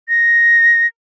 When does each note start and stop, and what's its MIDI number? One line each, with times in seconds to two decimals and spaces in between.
0.09 0.87 94